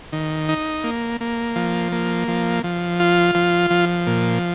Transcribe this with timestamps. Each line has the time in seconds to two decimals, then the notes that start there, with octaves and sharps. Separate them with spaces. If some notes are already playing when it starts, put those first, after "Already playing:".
0.13 D#3
0.49 D#4
0.84 A#3
1.21 A#3
1.56 F3
1.92 A#3
2.28 F3
2.64 F3
3.00 F4
3.35 F3
3.70 F3
4.07 A#2